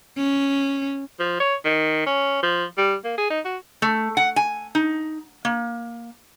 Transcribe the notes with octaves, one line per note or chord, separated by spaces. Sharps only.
C#4
F3
C#5
D#3
C#4
F3
G3
A#3
G#4
D#4
F#4
A3
F#5
G#5
D#4
A#3